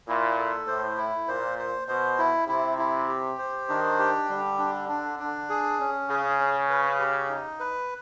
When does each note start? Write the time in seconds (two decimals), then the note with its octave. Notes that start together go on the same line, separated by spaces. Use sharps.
0.08 A#2 E4
0.38 A4
0.67 A2 C5
0.97 E4
1.28 A#2 C5
1.58 C5
1.88 B2 C5
2.18 E4
2.48 C3 E4
2.78 E4
3.08 G4
3.39 C5
3.69 D#3 D4
3.99 G4
4.29 D3 G3
4.59 D4
4.89 D4
5.19 D4
5.49 G#4
5.80 C#4
6.09 C#3 G#4
6.40 C#4
6.69 B4
6.99 G4
7.29 D#4
7.60 B4